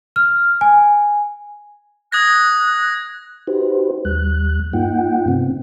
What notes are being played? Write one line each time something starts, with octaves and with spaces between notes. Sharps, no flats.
F6
G#5
D#6 F#6 G#6 A#6
D#4 F#4 G4 B4 C5
D#2 G3 F#6
G2 A#3 D#4 F4 F#5 G5
C3 B3 C4